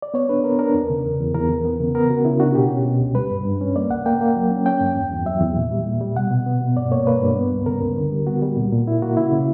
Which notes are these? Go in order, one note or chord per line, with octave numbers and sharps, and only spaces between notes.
D5
B3 C#5
D4 B4
B3 A#4
D4 A#4
E2
C#3
E2
E2
E2 A#4
E3
B3
C#3
B3 A#4
C#3 F#4
C#3 E4
D4 F#4
B2 G4
C#4
B2
C#2
G3 B4
G2
G2
C#4
A#3 D5
C#2 F#5
A#3 G5
A#3
F#3
C#4
C#4 G5
G2
E2
E2
F#3 E5
E2
A#2
G3
A#2
G3
B2 F#5
B2
B3
B2
G2 D5
A#3 C#5
A#3 B4
G2
B3
C#2
C#3 A#4
C#2
D3
G3
B3 F#4
G3
A#2
A#2
A#3 E4
A#3 F#4
C#3 E4
C#3